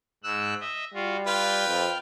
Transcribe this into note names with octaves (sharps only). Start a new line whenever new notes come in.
G#2 E6 F#6
D#5 E5
G3 F4 F#4
F4 B4 G5 F6
F2